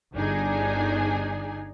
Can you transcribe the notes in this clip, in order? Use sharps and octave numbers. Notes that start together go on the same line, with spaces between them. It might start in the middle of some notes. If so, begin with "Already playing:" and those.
G1 D4 D#4 G#4 G#5